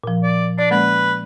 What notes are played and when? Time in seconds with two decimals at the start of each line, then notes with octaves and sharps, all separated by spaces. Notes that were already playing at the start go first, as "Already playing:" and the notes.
0.04 A#2 F3
0.23 D5
0.59 D4 D5
0.71 G#3 A#3 C#4 B4